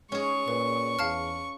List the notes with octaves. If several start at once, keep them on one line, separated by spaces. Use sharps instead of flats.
G#3 C#4 G#4 C#6
A#2 B4
E2 F5 A5 F6